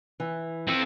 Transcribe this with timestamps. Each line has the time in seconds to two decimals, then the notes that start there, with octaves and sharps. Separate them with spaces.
0.20 E3
0.67 C4 A4